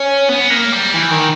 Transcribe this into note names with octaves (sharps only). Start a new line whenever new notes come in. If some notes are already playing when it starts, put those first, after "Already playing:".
Already playing: C#4
B3
A#3
G3
E3
D#3